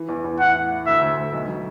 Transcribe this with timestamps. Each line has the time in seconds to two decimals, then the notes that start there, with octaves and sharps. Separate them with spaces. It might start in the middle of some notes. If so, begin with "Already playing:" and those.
Already playing: E3
0.09 E2
0.24 E2
0.39 A2 F#5
0.55 A2
0.72 A2
0.86 D2 E5
1.01 D2
1.18 D2
1.33 B1
1.49 F#3